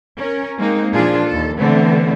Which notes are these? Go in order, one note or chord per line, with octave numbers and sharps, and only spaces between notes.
C#4 A#4
G#3 A#3 C4 D#4
A#2 F3 D4 F4 G#4
D#2 A4
B2 D3 E3 A3 B3 C4